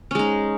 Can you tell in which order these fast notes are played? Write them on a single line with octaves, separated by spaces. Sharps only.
C#4 G#3 D#4